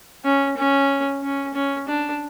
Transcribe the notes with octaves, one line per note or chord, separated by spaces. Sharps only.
C#4
C#4
C#4
C#4
D4